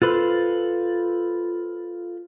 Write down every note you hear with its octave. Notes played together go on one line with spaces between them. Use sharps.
F4 A4 B4 C5